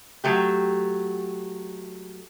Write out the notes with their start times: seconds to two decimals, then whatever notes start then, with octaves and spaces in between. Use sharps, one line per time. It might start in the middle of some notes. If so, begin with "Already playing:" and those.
0.24 F#3 A3 G4